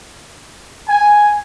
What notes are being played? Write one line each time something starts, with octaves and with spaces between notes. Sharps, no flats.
G#5